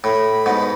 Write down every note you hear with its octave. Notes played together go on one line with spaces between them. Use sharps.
A2 B5
G#2 B2